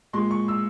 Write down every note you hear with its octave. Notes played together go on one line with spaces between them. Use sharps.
A#2 G#3 C6
C#6
E6